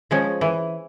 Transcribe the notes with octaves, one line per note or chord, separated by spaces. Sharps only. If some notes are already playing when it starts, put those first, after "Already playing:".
F3 G#3 C#4
E3